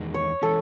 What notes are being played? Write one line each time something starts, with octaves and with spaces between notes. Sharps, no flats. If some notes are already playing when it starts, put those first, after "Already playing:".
Already playing: E2 D#3 G#3
C#5
E3 G#3 C#4 A4